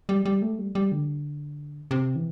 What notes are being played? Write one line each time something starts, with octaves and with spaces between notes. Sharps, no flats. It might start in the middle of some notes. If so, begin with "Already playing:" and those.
G3
G3
A3
G3
G3
D3
C3
E3